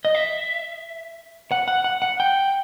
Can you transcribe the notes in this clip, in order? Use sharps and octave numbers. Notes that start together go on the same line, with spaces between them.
D#5
E5
F#5
F#5
F#5
F#5
G5